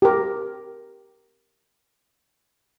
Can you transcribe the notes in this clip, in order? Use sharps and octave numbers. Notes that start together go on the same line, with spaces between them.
G4 A#4